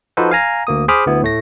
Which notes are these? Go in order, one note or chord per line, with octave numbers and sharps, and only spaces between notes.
F3 D#4 F#4 A4 B4 C5
F5 G#5 A#5
D2 A#3 D#6
G#4 C5 B5 D6 D#6 F6
D2 B3 E4
A2 A3 A#6